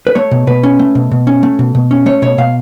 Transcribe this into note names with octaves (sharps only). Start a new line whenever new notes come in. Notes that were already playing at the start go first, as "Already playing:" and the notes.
B4
A3 C#5
B2
B2 B4
C#4
A3
B2
B2
C#4
A3
B2
B2
C#4
A3 C#5
B2 C#5
B2 F5